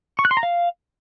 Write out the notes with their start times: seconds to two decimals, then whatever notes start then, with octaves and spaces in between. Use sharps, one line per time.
0.19 C#6
0.25 F#6
0.31 C6
0.37 A#5
0.43 F5